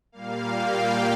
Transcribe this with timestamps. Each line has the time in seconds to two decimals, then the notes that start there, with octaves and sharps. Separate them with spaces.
0.12 A#2 G3 A#3 F5
0.52 G5